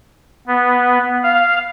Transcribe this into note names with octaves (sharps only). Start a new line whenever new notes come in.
B3
F5